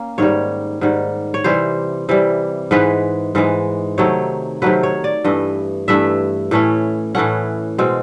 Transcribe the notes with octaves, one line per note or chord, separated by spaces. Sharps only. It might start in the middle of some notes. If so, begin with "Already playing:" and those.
Already playing: A#3 C#4
G#2 D#3 G3 C#5
G#2 D#3 G3
C#5
C3 E3 G3 C5
C3 E3 G3
G#2 E3 G#3 B4
G#2 E3 G#3
C3 D#3 F#3 A3 C#5
C3 D#3 F#3 A3 B4
C#5
D5
G2 E3 A3 D#5
G2 E3 A3 E5
A2 E3 A3 C#4
A2 E3 A3 C#4 F#5
B2 G#3 C4